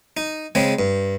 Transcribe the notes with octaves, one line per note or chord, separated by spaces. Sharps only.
D#4
C#3 G#3 C4
G2